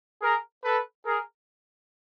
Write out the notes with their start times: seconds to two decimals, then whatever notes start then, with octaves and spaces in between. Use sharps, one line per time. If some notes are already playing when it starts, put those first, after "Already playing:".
0.22 G#4 A#4
0.64 A4 B4
1.06 G#4 A#4